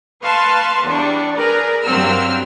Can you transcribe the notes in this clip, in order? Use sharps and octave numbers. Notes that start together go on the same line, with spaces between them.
B4 F5 A5 C6 C#6
E2 G3 D4 D5 C#6
G#4 A#4 B4 D5
G2 F#3 A#3 C4 E6 F6